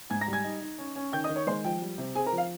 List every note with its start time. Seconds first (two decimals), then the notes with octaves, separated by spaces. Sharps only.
0.10 G#2 G#5 G#6
0.21 A#5 A#6
0.28 G3
0.33 G#5 G#6
0.44 D#4
0.61 D#4
0.78 C#4
0.96 C#4
1.12 D#3 G5 G6
1.24 D#5 D#6
1.29 D#3
1.36 C#5 C#6
1.47 G#3 C5 C6
1.64 F3 G5
1.82 G3
1.98 C3
2.15 C4 G#4 G#5
2.26 A#4 A#5
2.32 F3
2.38 F5